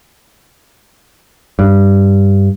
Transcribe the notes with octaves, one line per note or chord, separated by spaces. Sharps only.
G2